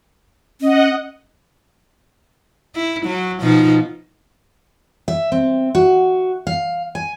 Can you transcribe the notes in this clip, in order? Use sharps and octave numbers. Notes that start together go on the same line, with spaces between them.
C#4 D#5 F#5
E4
F#3
B2 F3 D#4
E5
C4
F#4
F5
G#5